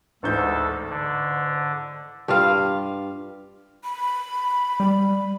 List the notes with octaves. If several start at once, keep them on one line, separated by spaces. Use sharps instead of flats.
A1 D2 G#2 A4 G6
D3
G2 G3 F4 F5
B5
G3